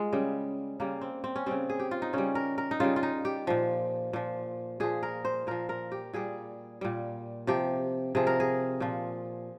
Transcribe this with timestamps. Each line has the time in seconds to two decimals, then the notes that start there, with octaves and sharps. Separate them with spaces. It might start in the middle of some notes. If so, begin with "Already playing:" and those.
Already playing: G#3 F4
0.13 C#3 G3
0.80 C#3 G3 A#3
1.01 C4
1.24 C4
1.36 C#4
1.46 C#3 G3 C4
1.70 G#4
1.80 G4
1.91 F4
2.02 D#4
2.13 C#3 G3 C#4
2.35 A#4
2.58 A#4
2.71 D#4
2.80 C#3 G3 F4
2.96 F4
3.03 D#4
3.25 G4
3.47 A#2 F3
4.13 A#2 F3
4.80 A#2 F3 G#4
5.03 A#4
5.25 C5
5.47 A#2 F3 A#4
5.69 A#4
5.92 G4
6.14 A#2 G3 G#4
6.81 A#2 G3
7.47 C3 F3 G4
8.15 C3 F3 G#4
8.27 A#4
8.40 G#4
8.80 A#2 F3